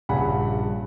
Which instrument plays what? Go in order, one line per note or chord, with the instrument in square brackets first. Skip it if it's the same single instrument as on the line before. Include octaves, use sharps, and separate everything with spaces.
[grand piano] A#1 G2 C#3 F#5 G#5 B5